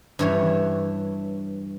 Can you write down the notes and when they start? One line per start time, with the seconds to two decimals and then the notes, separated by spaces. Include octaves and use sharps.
0.19 G2 E3 C#5